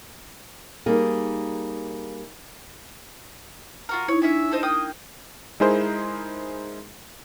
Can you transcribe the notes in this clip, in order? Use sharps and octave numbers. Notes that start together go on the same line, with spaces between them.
G3 A#3 D#4 G#4
F4 F#4 A#4
D#4 E4 C#5
C#4 D4 E5 G#5
A4 C5 D#5
A#3 G5 D#6
G#3 D#4 E4 G#4 A#4 C5